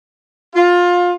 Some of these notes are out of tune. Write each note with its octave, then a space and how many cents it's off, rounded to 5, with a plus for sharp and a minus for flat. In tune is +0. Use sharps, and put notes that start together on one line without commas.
F4 +20